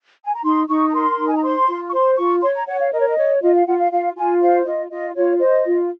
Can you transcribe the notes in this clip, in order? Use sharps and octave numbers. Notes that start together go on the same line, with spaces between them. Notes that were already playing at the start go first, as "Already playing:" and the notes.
G#5
A#5
D#4 C6
D#4 C#6
A#5
A#4 C6
D#4
G#5
A#5
C5 C6
F4
C#6
C5 C6
F4 C#6
C#5 C6
A#5
C#5 F#5
F5
A#4 D#5
C#5
D#5
C#5
F4 D#5
F5
F4 F#5
F5
F4 F5
F4 G#5
C5 F5
F4 D#5
F4 D#5
F4 C#5
C5 D#5
F4